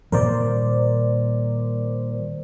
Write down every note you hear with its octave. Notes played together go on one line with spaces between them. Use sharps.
A#2 D#3 G3 A#4 C5 D5